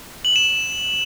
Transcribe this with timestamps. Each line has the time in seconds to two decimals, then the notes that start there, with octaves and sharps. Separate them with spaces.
0.25 F#7
0.36 E7